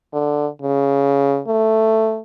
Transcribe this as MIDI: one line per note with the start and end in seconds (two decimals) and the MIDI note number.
0.14 0.47 50
0.62 1.40 49
1.47 2.21 57